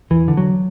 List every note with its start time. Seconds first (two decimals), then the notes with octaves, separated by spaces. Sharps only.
0.10 E2 E3
0.28 D3
0.37 F#3